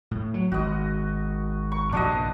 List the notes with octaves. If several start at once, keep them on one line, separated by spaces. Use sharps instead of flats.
A2
F#3
G#1 F#4 D#5
C#6
A#1 G2 C3 D4 F#4 D#5